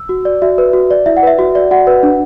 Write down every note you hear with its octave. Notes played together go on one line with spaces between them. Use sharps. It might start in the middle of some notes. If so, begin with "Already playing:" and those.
Already playing: E6
F#4
D5
F#4 E5
B4
F#4
D5
E4 E5
F#5
B4 E5
F#4
D5
F#4 F#5
B4
D4